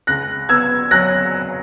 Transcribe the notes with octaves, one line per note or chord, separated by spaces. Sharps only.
C#2 F#6 A#6
B3 E6 G#6
F#3 F#6 A#6